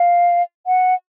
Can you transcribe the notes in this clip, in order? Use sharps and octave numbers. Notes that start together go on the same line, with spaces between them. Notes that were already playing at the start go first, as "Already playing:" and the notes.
Already playing: F5
F#5